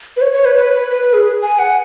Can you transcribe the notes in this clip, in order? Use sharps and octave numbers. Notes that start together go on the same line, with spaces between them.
B4
C#5
C#5
B4
B4
B4
B4
B4
G#4
G#5
F#5